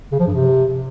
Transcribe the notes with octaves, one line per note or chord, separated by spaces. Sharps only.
C#3
F3
G2
C3